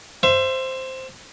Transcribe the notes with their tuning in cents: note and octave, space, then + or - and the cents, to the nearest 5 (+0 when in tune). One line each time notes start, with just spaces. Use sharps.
C5 +0 E5 +30